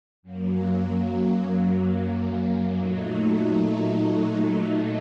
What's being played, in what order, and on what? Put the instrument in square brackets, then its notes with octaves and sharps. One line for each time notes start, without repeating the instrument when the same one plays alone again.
[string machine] F#2 F#3 A#3
A#2 F#3 A3 D#4